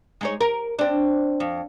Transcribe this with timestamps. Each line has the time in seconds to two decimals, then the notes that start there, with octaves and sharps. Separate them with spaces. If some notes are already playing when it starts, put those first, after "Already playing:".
0.21 G#3 D#4 C#5
0.41 A#4
0.79 C4 D4
1.40 F2